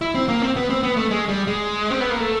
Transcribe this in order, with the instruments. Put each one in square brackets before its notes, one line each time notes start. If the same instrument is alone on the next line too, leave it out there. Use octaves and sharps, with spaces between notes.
[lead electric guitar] E4
C4
A#3
C4
B3
C4
B3
A3
G#3
G3
G#3
C4
B3
A#3
A3